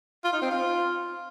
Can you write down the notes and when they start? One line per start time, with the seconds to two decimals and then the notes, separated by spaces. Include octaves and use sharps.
0.24 F4
0.33 D#4
0.42 C4
0.51 F4